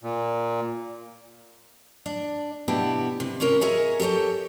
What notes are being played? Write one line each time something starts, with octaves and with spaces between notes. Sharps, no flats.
A#2
D4 D5
B2 E3 B3 D4 E4 G4
C3
C#4 E4 F4 A#4 C#5
G#4 A#4 C#5 D#5 E5 G#5
G4 A4 C5 C#5 G5